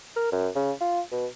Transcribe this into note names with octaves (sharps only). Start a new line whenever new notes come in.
A#4
F#2
C#3
F4
B2